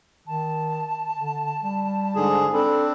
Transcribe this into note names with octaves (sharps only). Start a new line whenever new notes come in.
D#3 A5
D3
G3
G#2 D3 G#4
C4 D4 A4 B5